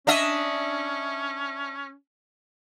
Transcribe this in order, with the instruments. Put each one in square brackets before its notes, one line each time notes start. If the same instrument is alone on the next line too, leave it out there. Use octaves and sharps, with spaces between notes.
[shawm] C#4 [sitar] D4 D#5 E5